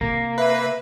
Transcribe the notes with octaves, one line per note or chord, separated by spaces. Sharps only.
C3 A#3
B4 E5